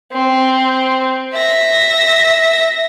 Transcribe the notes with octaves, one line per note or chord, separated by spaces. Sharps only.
C4
E5 A#6